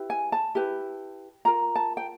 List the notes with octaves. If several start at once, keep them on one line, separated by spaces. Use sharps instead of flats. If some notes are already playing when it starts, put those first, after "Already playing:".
Already playing: E4 G4 B4
G#5
A5
E4 G4 B4
F4 A#4 A#5
A5
G5